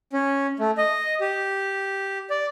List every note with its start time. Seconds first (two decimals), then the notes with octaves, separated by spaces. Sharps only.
0.13 C#4
0.59 A3
0.77 D#5
1.21 G4
2.30 D5